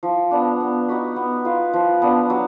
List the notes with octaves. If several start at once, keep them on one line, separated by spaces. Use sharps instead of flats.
F3
B3 D4
B3
D#4 F#4 B4
B3
F4 B4 F5
F3
B3 D4
F#3